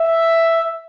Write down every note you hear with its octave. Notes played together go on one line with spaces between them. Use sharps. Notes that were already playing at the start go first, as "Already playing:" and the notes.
Already playing: E5